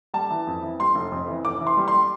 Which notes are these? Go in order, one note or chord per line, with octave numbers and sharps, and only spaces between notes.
G3 A5
E3
F2
E3
G3 C6
F1
F2
E3
F1 D6
E3
C6
G3
C6
G3